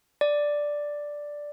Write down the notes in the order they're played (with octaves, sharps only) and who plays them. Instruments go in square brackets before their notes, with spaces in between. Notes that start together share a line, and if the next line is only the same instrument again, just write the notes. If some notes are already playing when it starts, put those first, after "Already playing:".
[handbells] D5